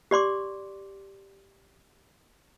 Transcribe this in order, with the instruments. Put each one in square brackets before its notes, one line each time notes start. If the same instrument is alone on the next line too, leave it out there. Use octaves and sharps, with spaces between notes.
[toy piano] G4 D5 C6 D6